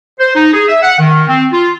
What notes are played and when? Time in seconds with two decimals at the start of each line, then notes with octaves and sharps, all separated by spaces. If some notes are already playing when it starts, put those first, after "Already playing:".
0.20 C5
0.35 D#4
0.53 G#4
0.68 E5
0.83 F#5
0.99 D#3
1.28 C4
1.53 F4